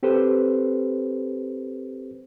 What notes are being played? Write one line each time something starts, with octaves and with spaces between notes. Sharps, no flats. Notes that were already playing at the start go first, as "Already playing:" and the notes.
C4 G4 A4 B4 C5